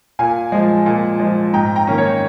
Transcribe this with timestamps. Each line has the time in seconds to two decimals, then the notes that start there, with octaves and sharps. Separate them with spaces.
0.19 A#2 F5 G#5
0.52 F3 G#3
0.86 A#2
1.20 F3 G#3
1.53 G#2 G5 A#5
1.76 G5 A#5
1.87 D#3 A#3 C#4
1.98 C#5